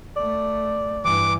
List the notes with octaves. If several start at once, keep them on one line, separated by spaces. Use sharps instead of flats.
A3 D5
G2 E3 D6